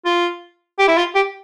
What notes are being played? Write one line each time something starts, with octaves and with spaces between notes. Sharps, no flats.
F4
G4
E4
F4
G4